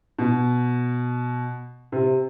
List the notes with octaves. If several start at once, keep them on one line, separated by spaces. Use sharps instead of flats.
B2
C3